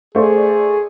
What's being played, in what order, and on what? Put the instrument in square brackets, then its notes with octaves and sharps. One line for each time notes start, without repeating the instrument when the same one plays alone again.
[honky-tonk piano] A3 C5 D5 [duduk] G#4